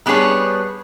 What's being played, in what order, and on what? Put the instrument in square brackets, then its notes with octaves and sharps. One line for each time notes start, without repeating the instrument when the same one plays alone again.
[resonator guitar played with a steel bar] G3 B3 D4 G#4 C#5